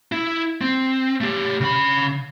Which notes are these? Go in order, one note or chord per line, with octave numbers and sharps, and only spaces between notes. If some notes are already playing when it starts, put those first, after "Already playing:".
E4
C4
A3 G4
C#3 B5